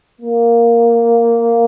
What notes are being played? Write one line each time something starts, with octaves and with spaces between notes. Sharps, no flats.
A#3